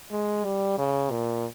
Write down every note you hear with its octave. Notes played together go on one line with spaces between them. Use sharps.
G#3
G3
C#3
A#2